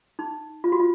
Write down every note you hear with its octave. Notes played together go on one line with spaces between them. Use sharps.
D#4
F4
F#4
F4